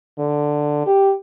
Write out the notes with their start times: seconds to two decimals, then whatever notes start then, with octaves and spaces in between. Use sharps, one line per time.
0.19 D3
0.86 G4